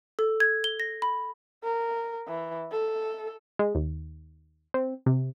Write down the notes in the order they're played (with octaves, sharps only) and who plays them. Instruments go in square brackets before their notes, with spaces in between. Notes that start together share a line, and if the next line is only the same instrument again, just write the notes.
[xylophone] A4
G#6
G7
A#6
B5
[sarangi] A#4
E3
A4
[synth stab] G#3
D#2
C4
C3